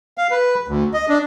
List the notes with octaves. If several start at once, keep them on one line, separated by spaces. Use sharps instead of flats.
F5
B4
D2
D#5
D4